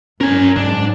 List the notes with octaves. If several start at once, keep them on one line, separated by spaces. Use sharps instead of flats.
G2 F#3 C#4 A#4 G#5
G#2 D4